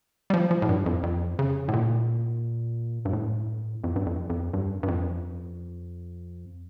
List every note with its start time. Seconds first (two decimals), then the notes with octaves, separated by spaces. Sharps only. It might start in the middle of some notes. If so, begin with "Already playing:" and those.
0.30 G3
0.34 F3
0.51 F3
0.62 A2
0.69 G2
0.86 F2
1.03 F2
1.39 C#3
1.68 A2
1.74 A#2
3.05 G2
3.13 A2
3.84 F2
3.96 G2
4.06 F2
4.30 F2
4.53 G2
4.83 G2
4.88 F2